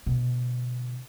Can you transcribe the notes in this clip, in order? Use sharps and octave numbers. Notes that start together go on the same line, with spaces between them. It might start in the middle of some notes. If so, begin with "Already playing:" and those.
B2 D3